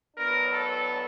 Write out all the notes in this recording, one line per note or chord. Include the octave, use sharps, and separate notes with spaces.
A2 F#3 B3 D4 A#4
A4